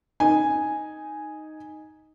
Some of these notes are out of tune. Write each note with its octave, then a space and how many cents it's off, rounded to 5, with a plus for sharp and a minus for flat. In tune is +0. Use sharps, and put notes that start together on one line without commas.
D#4 +0 G#5 +0